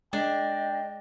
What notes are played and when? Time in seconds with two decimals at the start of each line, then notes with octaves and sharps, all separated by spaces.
0.13 G#3 D4 D#5 G5